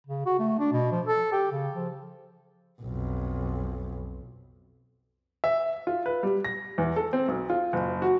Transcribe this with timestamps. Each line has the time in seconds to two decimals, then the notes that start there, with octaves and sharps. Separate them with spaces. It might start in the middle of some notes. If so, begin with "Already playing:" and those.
0.07 C#3
0.26 F#4
0.39 A3
0.59 D4
0.72 B2
0.92 F3
1.06 A4
1.32 G4
1.52 C#3
1.76 F3
2.82 B1 F2
5.44 E5
5.87 F4
6.06 B4
6.23 G3
6.45 A#6
6.78 E2
6.96 A4
7.13 C4
7.28 B1
7.50 F4
7.73 F#1
8.02 F#4